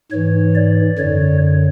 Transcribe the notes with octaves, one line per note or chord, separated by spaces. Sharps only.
G#2 E3 C#5
D5
F#2 D3 C#5